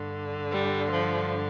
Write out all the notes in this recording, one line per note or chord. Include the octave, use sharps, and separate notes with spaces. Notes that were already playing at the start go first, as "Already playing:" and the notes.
Already playing: G2 D3
G3
F3